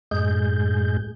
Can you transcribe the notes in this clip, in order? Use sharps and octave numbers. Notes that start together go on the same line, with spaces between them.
F#2 A2 G#3 G#4 G6